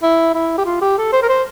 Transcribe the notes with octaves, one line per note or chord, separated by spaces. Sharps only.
E4
E4
G4
F4
G4
A4
C5
A#4
C5